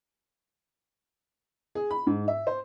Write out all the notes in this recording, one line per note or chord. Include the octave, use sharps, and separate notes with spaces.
G#4
B5
G#2
E5
C5